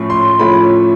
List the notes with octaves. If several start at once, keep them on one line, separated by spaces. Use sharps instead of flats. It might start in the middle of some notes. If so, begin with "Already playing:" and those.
Already playing: A2 F3 A3 C#4
C6
A2 F3 A3 C#4 B5